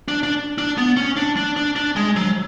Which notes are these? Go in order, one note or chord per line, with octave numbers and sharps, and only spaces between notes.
D4
D4
D4
B3
C#4
D4
D4
D4
D4
G#3
F#3